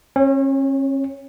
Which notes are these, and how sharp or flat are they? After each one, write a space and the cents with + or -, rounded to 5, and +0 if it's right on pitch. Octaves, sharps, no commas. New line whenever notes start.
C#4 -40 C#5 +0